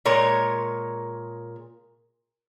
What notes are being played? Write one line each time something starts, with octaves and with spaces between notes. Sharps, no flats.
A#2 G#3 A#4 C#5